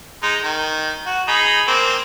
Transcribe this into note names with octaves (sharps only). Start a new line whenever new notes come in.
G#3 D#4
D#3
F#4
D#4 G#4 B5
A#3 C4